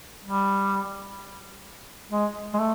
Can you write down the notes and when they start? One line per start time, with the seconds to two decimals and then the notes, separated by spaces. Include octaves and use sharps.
0.24 G3
2.11 G#3
2.54 G#3
2.59 A3